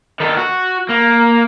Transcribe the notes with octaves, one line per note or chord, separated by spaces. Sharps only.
D#3 A4
F#4
A#3